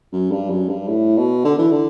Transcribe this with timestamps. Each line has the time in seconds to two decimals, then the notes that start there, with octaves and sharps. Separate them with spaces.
0.13 F#2
0.32 G2
0.50 F#2
0.69 G2
0.88 A2
1.17 B2
1.45 D3
1.58 E3
1.72 D3